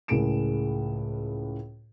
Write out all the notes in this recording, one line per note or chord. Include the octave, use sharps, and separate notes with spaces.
C#2 A2 G#4 A#4 D7 E7